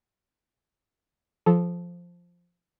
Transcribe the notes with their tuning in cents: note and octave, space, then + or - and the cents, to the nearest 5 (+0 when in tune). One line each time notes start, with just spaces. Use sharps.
F3 +0 A4 -25